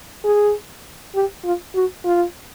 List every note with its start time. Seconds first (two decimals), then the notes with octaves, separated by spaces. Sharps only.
0.25 G#4
1.15 G4
1.45 F4
1.76 F#4
2.05 F4